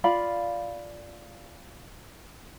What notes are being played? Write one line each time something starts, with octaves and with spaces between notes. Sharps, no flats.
F4 D5 F5 B5